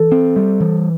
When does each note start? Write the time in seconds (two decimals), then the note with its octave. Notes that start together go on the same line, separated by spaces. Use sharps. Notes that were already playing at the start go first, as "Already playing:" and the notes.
Already playing: E3 A4
0.12 C4
0.36 G3
0.60 E3